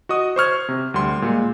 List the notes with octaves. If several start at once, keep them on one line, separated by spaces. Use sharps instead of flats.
F#4 D#5 D#6
C5 C#6 F6 G#6
C3
D2 G3 C6
A#2 G#3